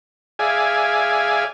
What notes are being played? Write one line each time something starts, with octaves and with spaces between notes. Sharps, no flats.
G#4 D5 E5 F5 G#5